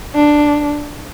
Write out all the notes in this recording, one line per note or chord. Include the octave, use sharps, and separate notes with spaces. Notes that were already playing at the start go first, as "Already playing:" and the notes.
D4